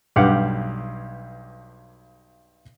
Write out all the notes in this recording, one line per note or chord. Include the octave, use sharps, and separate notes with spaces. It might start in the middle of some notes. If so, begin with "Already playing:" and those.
B1 G2 G4 F5 F#5 D6